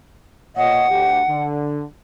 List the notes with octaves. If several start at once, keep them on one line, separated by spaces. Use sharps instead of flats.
A#2 C#5 D#5 F#5
D2 G4
D3